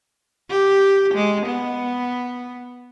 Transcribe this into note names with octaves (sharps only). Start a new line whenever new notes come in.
G4
G#3
B3